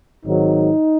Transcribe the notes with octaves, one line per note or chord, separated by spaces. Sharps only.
G#1 G#2 D#3 F#3 D#4